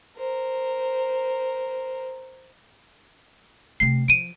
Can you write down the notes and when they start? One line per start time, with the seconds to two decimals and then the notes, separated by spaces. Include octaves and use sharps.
0.17 A#4 C5
3.80 C3 A3 C7
4.08 F3 D7 D#7